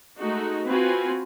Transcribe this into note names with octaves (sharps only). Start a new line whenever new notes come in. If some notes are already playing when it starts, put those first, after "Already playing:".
G#3 A3 D#4 F#4
C4 F4 F#4 B4 G#5